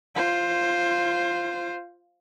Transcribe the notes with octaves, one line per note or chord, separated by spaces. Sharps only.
F4 C5